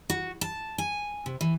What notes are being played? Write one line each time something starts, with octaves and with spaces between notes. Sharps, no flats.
F#4
A5
G#5
C3
E3